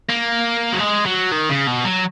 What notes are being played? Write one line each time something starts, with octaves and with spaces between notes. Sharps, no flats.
A#3
F#3
G#3
F#3
D#3
C#3
B2
F#3